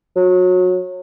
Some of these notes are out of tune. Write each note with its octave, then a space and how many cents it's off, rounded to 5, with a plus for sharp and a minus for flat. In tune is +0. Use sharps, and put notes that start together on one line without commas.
F#3 -25